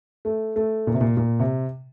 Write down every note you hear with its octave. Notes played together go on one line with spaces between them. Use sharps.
A3
A3
A#2
C3
A#2
A#2
C3